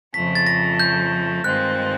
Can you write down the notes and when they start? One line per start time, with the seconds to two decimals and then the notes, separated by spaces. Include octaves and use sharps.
0.14 F2 C#3 F3 A3 B6
0.35 A6
0.46 A#6
0.80 G6
1.44 G2 D#3 G#3 C4 F4 F#6